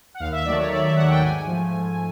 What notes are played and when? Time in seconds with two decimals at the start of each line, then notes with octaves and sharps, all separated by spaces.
0.14 F#5
0.20 D#2 F5
0.32 E5
0.45 D#3 F#3 A3 D5
0.58 C#5
0.70 D#2 D5
0.84 E5
0.96 D#3 F#3 A3 F#5
1.09 G5
1.22 G#2 G#5
1.47 F3 A3
1.73 G#2